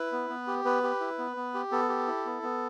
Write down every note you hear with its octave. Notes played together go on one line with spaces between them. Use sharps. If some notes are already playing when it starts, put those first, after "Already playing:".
Already playing: E4 B4
B3
B3
G4
B3 B4
G4
E4
B3
B3
G4
B3 A4
G4
E4
B3
B3